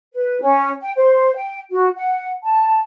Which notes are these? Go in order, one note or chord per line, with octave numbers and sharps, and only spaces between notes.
B4
C#4
G5
C5
G5
F#4
F#5
A5